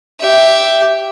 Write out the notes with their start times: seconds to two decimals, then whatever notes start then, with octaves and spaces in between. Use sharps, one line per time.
0.20 G4 E5